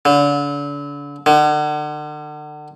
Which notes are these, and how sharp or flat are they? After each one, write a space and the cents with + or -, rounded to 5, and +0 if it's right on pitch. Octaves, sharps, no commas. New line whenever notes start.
D3 -35
D3 +40